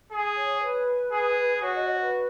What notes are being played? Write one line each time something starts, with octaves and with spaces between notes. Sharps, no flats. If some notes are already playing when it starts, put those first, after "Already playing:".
G#4
C#5
B4
G#4
F#4 C#5
D#5
C#5
B4